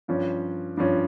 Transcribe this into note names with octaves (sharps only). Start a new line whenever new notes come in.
G2 F3 C#4
G2 F3 C#4